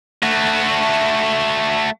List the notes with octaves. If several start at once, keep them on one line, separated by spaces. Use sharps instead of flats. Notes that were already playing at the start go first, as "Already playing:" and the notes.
A3 F#4